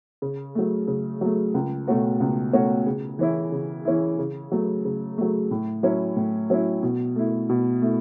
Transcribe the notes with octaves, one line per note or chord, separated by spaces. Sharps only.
C#3
F#3 A3
C#3
F#3 A3
C#2
B2 A3 C#4 F#4
C#2
B2 A3 C#4 F#4
C#3
E3 C#4 E4
C#3
E3 C#4 E4
C#3
F#3 A3
C#3
F#3 A3
A2
F#3 C#4 E4
A2
F#3 C#4 E4
B2
A3 E4
B2
A3 E4